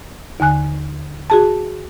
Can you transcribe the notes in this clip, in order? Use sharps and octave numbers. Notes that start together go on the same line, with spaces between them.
D#2 D3 G#5 F#6
F#4 G#4 A5